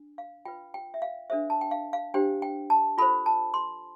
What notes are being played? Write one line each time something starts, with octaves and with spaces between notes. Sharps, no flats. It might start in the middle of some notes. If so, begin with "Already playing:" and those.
Already playing: D4
F5
F4 B4 G5
G5
E5
F5
D4 A4 C5 E5
A5
G5
F5
F5
D4 G4 C5 G5
G5
A5
F4 A4 C5 B5
A5
C6